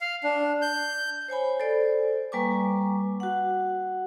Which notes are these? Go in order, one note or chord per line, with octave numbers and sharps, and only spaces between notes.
F5
D4
G6
C5 C#5 G#5 B5
A4 C5 D5
G3 A#3 B4 G#5 C#6 D6
F#4 F#5